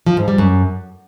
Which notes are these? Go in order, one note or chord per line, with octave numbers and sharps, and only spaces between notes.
F3
G#2
G3
F#2